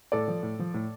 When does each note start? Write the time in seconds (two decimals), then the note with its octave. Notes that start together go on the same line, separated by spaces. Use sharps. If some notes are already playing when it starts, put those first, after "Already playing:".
0.12 A2 A4 D5
0.28 F3
0.43 A2
0.59 F3
0.74 A2